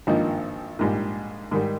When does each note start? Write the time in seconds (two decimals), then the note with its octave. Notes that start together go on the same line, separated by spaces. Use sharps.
0.07 G#1 G2 F3 A#3 D#4
0.79 A#1 G#2 G3
1.51 G#2 D#3 G3